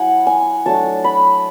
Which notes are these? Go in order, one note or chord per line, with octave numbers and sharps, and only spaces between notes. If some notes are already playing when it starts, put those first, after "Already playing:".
Already playing: F#3 E4 F#5 G#5 B5
G#5
F#3 A3 D4 A5
B5